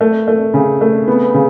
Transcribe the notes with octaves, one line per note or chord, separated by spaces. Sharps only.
A3
A3
C#3
A3
B3
C#3